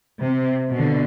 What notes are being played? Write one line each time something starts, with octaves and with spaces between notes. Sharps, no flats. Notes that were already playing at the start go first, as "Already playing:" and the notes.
C3
B2 D3